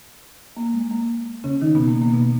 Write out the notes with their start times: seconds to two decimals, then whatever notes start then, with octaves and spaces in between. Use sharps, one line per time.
0.57 A#3
0.74 G#3
0.91 A#3
1.44 C#3 C#4
1.61 D#3 D#4
1.75 B2 B3
1.87 A#3
2.02 A#3
2.14 B2 B3